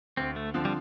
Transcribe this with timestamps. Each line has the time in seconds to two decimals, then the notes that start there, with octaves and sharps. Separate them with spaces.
0.17 D2 C4
0.36 A3
0.54 D3 F3 C4
0.65 G3